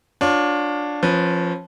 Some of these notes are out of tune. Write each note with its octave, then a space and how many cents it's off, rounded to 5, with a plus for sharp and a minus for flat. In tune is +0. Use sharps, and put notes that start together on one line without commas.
D4 +0 F4 +35 C#5 +0
F3 +0 C#4 -30 B4 +0